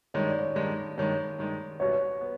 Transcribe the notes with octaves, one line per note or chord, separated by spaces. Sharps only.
G2 D#3 G#3 C#5
D5
C#5
G2 D#3 G#3
G2 D#3 G#3 C#5
G2 D#3 G#3
C2 B2 G3 B3 C#5
B3